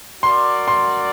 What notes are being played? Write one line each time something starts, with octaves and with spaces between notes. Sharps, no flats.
F#4 A#4 D5 C6
C6